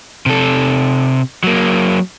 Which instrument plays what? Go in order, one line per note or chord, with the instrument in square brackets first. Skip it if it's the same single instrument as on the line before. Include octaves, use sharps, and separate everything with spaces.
[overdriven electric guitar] C3 A4
F#3 A#3